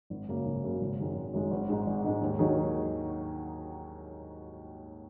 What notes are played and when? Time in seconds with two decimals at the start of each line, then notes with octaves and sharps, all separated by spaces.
0.10 G#1
0.29 F#2 C#3 F#3 A#3
0.46 G#1
0.64 F#2 C#3 F#3 A#3
0.81 G#1
0.99 F#2 D#3 G#3
1.16 G#1
1.34 F#2 D#3 G#3
1.51 G#1
1.68 G#2 G#3 D#4
1.86 G#1
2.04 G#2 G#3 D#4
2.21 D#2
2.39 D#3 F#3 D#4 G#4
2.56 D#2